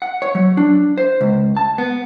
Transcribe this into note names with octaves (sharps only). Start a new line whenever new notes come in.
F#5
C#5
F#3
D4
C5
C#2
A5
B3